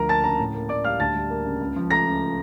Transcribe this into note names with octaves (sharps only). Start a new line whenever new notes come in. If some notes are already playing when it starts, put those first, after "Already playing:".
Already playing: D2 F3 A#4 A#5
A#3 A5 A6
C#3 A#4 A#5
A2
A#3
A2 D5 D6
G3 F5 F6
D2 A5 A6
G3
A#3
C#3
C#2
F3
A3 A#5 A#6
C#3